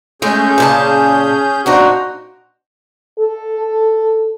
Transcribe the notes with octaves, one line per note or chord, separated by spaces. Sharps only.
G#3 A3 C#4 G#4 G6
A#2 C#3 A5
A#2 D4 D#4 F#4 C5
A4